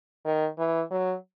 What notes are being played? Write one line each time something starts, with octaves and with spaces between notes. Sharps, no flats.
D#3
E3
F#3